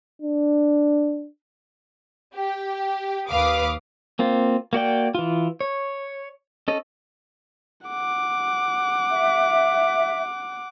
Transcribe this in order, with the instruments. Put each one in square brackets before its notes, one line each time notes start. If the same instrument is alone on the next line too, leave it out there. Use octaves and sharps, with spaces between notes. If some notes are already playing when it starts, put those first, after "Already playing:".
[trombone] D4
[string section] G4
D#2 B4 F5 D6 D#6
[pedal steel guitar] A#3 C4 F4
A#3 F#4 D5 G5
E3 F4
C#5
C#4 A4 D#5
[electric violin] F#5 D6
[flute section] E5